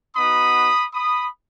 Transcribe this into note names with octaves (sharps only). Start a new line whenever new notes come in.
B3 D#4 F#4 B5 D#6
B5 D#6